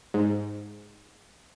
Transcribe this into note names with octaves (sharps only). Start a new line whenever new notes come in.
G#2